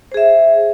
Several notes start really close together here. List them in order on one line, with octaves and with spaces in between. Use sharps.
C5 G#4 E5